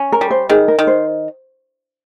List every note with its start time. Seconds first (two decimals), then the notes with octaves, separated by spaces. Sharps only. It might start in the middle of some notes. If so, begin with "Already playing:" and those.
Already playing: C#4
0.12 A#4
0.21 G3
0.31 C5
0.49 D#3 G#4
0.68 A#4
0.79 D#3
0.87 C5